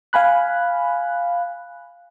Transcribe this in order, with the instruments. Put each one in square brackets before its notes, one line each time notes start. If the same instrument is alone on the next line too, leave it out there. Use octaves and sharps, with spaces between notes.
[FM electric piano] F5 G#5 B5 F#6